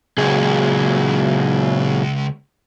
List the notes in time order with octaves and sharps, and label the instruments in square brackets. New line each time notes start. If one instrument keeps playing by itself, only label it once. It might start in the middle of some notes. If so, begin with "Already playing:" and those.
[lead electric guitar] C#2 [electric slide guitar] A#2 F#3 G#4